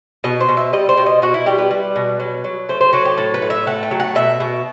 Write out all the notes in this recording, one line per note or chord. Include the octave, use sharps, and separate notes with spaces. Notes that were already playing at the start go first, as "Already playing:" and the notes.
B2 D#5
C5
B2
E5
G3 D#5
C5
B2
D#5
B2 F#4
E4
G3 G4
B4
G3
B2
F#3
F#3
A3 C5
C5
F#3 F#4
G4
A2 A4
B4
A2
E5
A3 F#5
G5
F#3
F#5
B2 E5
B2